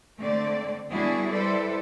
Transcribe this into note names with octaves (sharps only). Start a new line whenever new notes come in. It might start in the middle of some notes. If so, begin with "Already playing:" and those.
D3 A3 C4 D5
G3 B3 D4 E4 F#4 G#4
G3 E4 A4 B4 C5 D5